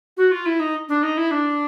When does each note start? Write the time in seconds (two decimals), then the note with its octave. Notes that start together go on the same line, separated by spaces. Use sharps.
0.17 F#4
0.32 F4
0.46 E4
0.60 D#4
0.89 D4
1.03 D#4
1.17 E4
1.31 D4